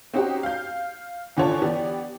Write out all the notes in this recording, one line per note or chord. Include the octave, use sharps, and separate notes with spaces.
C4 C#4 D#4 F#4 G4
F5 G6
E2 D3 F4 C#5 A5
E3 B3 G4 D5